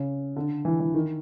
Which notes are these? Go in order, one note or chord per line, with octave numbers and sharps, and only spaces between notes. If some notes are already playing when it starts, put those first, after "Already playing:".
Already playing: C#3
D3
E3
E3
D#3